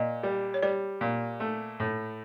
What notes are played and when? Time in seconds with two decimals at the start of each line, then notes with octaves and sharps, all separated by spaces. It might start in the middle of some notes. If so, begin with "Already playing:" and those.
Already playing: A#2 D#5
0.23 G3
0.54 C#5
0.63 G3 D5
1.01 A#2
1.40 A3
1.80 A2